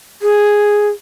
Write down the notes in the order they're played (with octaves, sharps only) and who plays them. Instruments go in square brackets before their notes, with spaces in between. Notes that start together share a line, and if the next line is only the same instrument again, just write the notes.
[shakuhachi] G#4